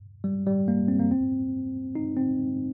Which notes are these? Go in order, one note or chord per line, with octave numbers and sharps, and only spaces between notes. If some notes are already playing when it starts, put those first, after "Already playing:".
G3
G3
A#3
C4
A#3
C4
D#4
C4